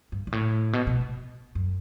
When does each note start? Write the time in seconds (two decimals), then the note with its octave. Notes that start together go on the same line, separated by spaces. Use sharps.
0.12 G2
0.27 G2
0.32 A2
0.73 B2
0.87 B2
1.55 F#2